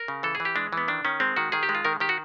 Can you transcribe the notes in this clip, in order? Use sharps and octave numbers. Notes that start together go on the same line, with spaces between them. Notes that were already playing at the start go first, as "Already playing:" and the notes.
Already playing: A#4
C#3
E3 A4
G#4
E3
G4
G#3 D4
E3 B3
D#3 D4
D#3 C#4
G#3 C4
D#3 F#4
D#3 G#4
G4
G#3
F4
D#3 A#4
D#3 G4
F#4